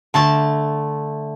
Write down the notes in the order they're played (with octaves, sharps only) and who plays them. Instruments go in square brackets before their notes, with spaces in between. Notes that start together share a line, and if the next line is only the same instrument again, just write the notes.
[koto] D3 A3 A5